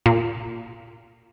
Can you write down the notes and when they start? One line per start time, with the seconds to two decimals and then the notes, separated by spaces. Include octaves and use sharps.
0.06 A#2